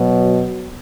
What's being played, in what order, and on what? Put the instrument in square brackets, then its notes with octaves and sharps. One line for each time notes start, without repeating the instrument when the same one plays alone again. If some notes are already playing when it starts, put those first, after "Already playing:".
Already playing: [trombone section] B2 F#3